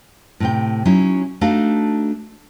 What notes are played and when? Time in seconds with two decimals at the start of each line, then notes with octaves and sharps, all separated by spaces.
0.40 A2 C3 G5
0.85 F#3 C#4 D#4 E4
1.41 A3 D4 D#4 F#4 F5